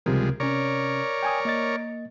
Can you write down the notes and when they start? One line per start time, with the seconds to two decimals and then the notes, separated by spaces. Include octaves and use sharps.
0.06 C#2 C3 F3 G3 G#3 A#4
0.40 C3 C#4 A#4 C#5 D5
1.23 G5 G#5 D#6
1.45 A#3 D#5 A6